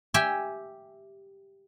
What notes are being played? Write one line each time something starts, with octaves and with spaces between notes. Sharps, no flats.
G4 E5 G5 G#5